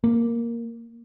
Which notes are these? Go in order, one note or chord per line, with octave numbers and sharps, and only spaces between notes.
A#3